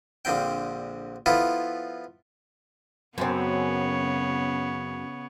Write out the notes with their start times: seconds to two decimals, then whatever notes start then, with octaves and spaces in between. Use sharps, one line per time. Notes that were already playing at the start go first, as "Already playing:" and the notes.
0.25 A#1 D3 F3 C4 G5
1.26 F3 B3 E4 F4 A4
3.18 F#2 C#3 B3 C4 C#5